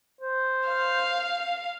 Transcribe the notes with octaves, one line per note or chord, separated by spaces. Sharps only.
C5
F5